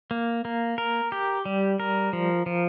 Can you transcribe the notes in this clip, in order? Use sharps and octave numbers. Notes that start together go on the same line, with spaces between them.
A#3
A#3
A#4
G4
G3
A#4
F3
F3